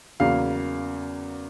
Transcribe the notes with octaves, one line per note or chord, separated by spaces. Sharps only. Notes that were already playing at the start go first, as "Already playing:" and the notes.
E2 C#3 F#3 A#3 F5